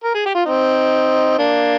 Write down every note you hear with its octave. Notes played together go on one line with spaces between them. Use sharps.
A#4
G#4
G4
F4
C4 D#4
A#3 D4